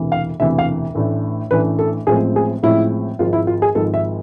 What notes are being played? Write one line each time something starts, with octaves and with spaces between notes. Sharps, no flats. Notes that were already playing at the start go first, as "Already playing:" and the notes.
Already playing: E1 D2 C3 E3
F5
E1 D2 C3 E3 E5
F5
A1 A2 E3 A3 D4
A1 A2 E3 A3 D4 B4
A4
A1 A2 F3 G#3 C4 G#4
G#4
A1 A2 F3 G#3 C4 E4
G#1 G#2 F3 G#3 F4
E4
F4
G#4
G#1 G#2 F3 G#3 A4
E5